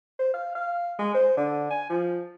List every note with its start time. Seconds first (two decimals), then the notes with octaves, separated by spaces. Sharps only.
0.19 C5
0.34 F5
0.55 F5
0.99 G#3
1.15 C5
1.37 D3
1.71 G#5
1.90 F3